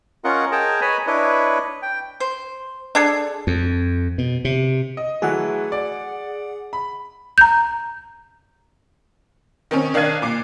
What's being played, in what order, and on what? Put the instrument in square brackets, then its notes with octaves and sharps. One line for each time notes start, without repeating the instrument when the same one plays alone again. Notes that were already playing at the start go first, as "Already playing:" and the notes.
[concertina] C#4 F4 A#4 D#5 F#5
G#4 A#4 D#5 G5 A5 A#5
B4 C#5 D#5 G#5 A#5 B5
D4 E4 B4 C#5 D#5
G5
[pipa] C5
D4 G#4 A4
[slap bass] F2
B2
C3
[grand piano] D#5
[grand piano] E3 F#3 A3 [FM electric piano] G#4 F#5
[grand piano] D5
B5
[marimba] A#5 G6
[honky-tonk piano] D#3 C4 C#4
D#3 D4 F5 F#6 G#6 D#7
A#2 D6 C7